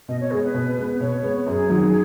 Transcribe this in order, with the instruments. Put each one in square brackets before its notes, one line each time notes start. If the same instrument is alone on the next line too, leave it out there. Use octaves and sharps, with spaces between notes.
[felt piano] B2 [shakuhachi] D#5
[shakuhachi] C#5
[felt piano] G#3 B3 [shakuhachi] G#4
[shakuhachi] B4
[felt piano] B2
G#3 B3
[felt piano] B2 [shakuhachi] C#5
[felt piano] G#3 B3
[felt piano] F#2 [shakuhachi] G#4
[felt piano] D#3 F#3